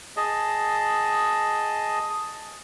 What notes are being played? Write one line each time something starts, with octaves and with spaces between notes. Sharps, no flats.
G#4 D#5 A5